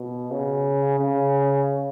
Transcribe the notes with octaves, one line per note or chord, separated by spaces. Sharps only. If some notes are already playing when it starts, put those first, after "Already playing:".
Already playing: B2
C#3
C#3